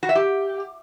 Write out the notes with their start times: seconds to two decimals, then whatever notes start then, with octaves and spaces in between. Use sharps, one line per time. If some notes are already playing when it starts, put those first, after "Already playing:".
0.03 F#4
0.09 E5
0.15 G4